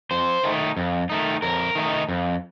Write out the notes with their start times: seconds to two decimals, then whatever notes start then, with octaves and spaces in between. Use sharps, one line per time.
0.11 F2 C5
0.44 D#3 A3 D#4
0.77 F2
1.10 D#3 A3 D#4
1.42 F2 A#4
1.75 D#3 A3 D#4
2.09 F2